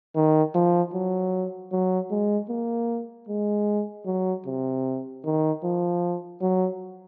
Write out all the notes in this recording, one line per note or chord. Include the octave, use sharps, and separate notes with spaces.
D#3
F3
F#3
F#3
G#3
A#3
G#3
F#3
C3
D#3
F3
F#3